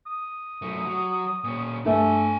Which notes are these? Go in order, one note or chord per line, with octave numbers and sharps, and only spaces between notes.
D#6
F#2 A3
F#3
A#2 C#4
G2 A3 D4 G#5